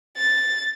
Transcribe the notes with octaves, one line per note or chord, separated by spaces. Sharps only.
A6